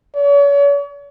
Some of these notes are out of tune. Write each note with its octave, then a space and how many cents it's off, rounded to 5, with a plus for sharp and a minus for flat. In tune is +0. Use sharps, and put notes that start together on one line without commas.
C#5 +40